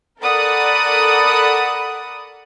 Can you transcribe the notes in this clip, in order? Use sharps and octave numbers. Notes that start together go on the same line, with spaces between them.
A4 A#4 D5 F#5 B5 D#6